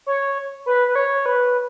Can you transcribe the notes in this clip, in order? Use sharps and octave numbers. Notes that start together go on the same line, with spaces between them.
C#5
B4
B4
C#5
B4